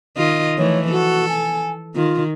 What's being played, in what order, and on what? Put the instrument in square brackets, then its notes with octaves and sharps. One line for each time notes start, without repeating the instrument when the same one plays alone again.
[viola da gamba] D#3 F4 D#5
[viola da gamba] E3 F3 A3 [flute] C#5
[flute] F#4 [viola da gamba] A4
[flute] G#5
[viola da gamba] D#3 [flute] F4